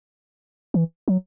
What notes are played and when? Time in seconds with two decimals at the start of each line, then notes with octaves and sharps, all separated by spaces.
0.74 E3
1.08 F#3